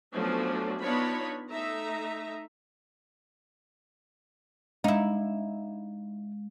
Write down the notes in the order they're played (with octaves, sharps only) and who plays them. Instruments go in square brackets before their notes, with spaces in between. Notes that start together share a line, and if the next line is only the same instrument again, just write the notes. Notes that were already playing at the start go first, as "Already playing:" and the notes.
[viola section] F3 F#3 A3 B3 C#4 D4
B3 D4 D#4 F4 C#5 B5
A3 D#4 E5 A#5
[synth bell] G#3 [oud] D#4 E4